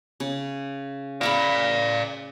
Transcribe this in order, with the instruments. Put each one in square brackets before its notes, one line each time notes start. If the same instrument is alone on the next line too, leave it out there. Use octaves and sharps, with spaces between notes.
[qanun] C#3
[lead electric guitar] D5 F5 [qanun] E5 A#5 B5